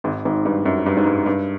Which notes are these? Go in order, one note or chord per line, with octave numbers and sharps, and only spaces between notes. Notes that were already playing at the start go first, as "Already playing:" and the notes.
G#1 G#2
G#1 G#2
G2
F#2
G2
G#2
G2
G2